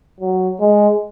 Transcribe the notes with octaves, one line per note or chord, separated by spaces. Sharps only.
F#3
G#3